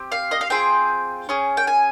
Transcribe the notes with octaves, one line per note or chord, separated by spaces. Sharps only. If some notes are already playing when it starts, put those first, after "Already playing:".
Already playing: C4 G4
F5
D#5
F5
C4 F4 G#4 G5
C#4 G#4
G5
G#5